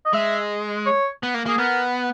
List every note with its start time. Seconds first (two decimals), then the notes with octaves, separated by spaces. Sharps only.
0.05 D#5
0.13 G#3 E5
0.86 C#5
1.23 B3
1.34 A#3
1.46 A#3 G#4
1.58 B3 A#4